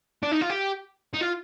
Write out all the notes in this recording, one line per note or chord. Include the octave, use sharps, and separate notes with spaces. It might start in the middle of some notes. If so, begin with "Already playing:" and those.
D4
D#4
F4
G4
D#4
F4